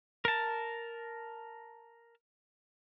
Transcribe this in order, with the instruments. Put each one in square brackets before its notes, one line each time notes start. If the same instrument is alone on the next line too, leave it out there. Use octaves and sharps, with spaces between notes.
[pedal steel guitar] A#4 A5